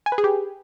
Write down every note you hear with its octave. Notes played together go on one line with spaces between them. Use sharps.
G#5
B4
G#4
G4